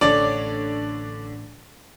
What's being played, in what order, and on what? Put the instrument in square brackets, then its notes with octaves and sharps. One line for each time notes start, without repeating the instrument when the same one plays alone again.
[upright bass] A1 [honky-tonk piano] D3 D4 C#5 [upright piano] D5